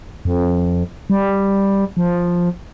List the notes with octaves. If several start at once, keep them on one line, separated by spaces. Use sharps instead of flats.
F2
G3
F3